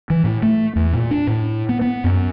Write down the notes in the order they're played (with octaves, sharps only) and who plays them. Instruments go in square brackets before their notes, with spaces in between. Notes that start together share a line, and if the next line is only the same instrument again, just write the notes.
[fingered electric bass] E3
A2
A3
E2
A#2
D4
A2
B3
B3
F#2